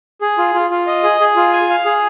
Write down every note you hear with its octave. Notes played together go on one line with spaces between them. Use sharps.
G#4
F4
F4
F4
D#5
G#4
G#4
F4
G#5
F5
G#4